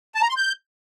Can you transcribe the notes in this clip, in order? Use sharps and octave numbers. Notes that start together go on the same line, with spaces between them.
A5
A#5
C6
G6